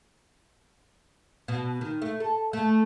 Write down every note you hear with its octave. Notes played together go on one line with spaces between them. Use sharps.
B2
D#3
A3
A4
A3